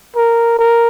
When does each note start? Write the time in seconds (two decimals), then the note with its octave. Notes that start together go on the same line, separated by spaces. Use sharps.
0.16 A#4
0.58 A#4